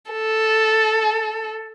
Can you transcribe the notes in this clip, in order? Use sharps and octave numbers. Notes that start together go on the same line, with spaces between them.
A4